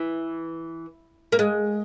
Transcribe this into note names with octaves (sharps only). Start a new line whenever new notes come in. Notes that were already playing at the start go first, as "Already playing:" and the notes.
Already playing: E3
A#3
G#3